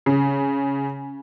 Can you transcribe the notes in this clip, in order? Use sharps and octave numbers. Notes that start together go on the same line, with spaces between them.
C#3